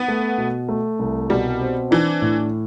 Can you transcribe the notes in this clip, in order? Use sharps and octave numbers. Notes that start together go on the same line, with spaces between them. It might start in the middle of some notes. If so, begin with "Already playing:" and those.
Already playing: B3
A3
B2
A3
C2
B2 G3
C4
E3 D4
A2